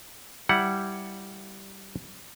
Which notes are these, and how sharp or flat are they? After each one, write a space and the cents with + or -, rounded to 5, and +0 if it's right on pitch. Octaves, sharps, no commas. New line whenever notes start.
G3 -5 E4 +5 F#5 +0